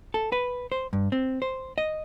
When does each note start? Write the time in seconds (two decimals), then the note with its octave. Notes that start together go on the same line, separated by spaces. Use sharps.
0.14 A4
0.32 B4
0.72 C5
0.93 G2
1.12 C4
1.42 C5
1.78 D#5